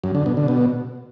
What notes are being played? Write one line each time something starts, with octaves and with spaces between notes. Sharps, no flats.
F#2
D3
B2
D3
B2